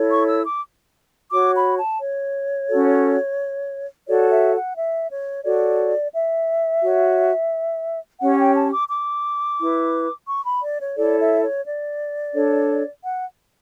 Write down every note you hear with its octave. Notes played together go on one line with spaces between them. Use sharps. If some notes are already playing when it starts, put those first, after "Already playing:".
Already playing: E4 A4 C#5
C#6
E6
D6
F#4 C#5 D6
B5
A5
C#5
C#4 F#4 A4
F#4 A4 C#5 D5
E5
F#5
E5
C#5
F#4 A4 C#5 D5
E5
F#4 C#5
C#4 G4 C#5 F#5
G5
A5
D6
D6
E4 B4
C#6
B5
D5
C#5
E4 A4 C#5 D5
E5
C#5
D5
D4 A4 C#5
F#5